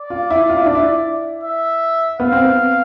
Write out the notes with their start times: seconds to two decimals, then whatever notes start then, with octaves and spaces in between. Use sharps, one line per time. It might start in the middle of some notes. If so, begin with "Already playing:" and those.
Already playing: D5
0.10 F4
0.30 E4
0.49 F4
0.57 E4
0.66 D4
0.75 E4
1.44 E5
2.19 B3 F5
2.32 C4
2.45 B3